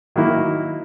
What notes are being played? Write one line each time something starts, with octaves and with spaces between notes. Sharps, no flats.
D#3 F#3 A#3 E4